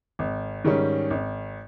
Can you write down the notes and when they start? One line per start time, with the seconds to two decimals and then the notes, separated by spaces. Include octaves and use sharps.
0.19 G#1
0.64 G#2 D#3 G3 C#4
1.10 G#1